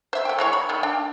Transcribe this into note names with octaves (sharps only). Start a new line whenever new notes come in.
C5 E5
A3 G5
E3 G#3 C#5
B5
D#3 A3
D4 G5